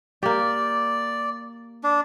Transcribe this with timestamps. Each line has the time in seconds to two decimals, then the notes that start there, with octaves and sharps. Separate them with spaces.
0.23 A#3 G4 D5
1.83 D4